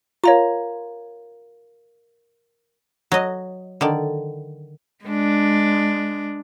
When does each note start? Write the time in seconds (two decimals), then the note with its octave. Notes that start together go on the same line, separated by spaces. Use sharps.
0.24 F4 A#4 C#5 F5 A#5
3.12 F#3 D#5
3.81 D3 D#3 D5
5.05 G#3 D4